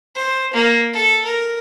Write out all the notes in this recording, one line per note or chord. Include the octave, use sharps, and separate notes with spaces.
C5
A#3
A4
A#4